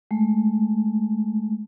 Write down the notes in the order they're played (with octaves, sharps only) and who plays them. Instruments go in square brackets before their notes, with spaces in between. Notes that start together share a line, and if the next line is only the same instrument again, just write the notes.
[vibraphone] G#3 A3